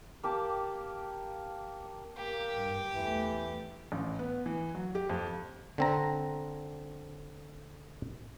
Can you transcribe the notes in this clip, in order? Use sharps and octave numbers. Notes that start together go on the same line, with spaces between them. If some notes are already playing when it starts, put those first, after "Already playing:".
A#3 G4 A5
A#3 G4
G2
E2 E3 A3
A1
B3
E3
F#3
G4
F2
D3 C4 A#5